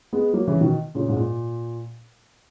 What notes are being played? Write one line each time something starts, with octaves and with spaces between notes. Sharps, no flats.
G#3 B3
F#3 A#3
C#3 E3
B2 D#3
A#2 C#3
G#2
A#2